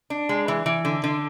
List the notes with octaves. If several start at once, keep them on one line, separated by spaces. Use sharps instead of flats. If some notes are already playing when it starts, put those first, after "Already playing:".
D4
G#3
E3
E3
D3
D3